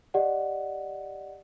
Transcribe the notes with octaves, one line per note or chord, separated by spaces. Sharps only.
G4 D5 D#5 F#5